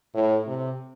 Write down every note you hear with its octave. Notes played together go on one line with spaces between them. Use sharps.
A2
C3